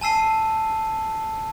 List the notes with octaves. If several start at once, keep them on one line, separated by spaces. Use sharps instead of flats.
G#5 A5 E6 C7 D#7